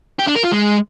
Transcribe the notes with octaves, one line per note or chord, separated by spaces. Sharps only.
G4
D4
A#4
F4
G#3